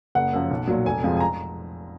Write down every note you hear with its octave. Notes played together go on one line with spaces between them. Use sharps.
F#1 F#5
F#2 F3
B1
A#2 F#3
F1 G#5
F2 F3 G#3
G#5
A#5